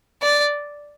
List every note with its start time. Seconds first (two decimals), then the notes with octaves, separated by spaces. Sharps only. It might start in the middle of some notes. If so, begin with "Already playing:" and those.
0.22 D5